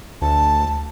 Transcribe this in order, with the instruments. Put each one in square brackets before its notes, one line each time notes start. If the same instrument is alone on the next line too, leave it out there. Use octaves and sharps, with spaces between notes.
[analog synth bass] D2 [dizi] A5